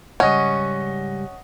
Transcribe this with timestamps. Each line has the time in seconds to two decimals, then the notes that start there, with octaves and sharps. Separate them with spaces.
0.20 G#2 C#3 G3 C#4 D#5 F#5